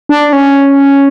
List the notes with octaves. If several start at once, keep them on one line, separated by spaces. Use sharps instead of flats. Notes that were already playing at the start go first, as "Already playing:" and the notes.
D4
C#4